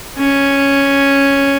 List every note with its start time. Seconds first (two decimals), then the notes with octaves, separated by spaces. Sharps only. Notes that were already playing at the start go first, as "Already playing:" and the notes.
0.18 C#4